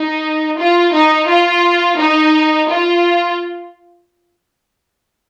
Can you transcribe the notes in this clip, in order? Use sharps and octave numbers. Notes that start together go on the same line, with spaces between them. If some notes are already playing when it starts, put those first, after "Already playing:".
Already playing: D#4
F4
D#4
F4
D#4
F4